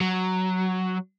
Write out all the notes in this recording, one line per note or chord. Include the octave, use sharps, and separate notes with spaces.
F#3